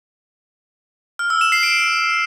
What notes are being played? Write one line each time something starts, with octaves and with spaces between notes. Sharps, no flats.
F6
E6
E7
C7
D7